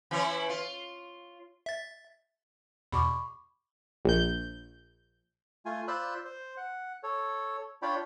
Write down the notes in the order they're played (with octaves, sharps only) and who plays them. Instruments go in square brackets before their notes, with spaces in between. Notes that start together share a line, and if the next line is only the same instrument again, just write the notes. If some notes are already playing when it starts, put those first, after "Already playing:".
[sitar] E3 E4 C#5
F4
[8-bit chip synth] E5 A6
[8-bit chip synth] E2 B2 [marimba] B5 C#6 D6
[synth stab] A#1 G6
[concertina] A3 F4 G#5
F4 C5 D5 B5 E6 F#6
C5
F#5
A4 C#5
D4 F4 C#5 D5 G5 B5